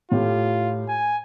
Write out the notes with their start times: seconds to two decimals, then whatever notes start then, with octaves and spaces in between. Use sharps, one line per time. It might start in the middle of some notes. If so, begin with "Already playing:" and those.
0.11 A2 F4 G4
0.89 G#5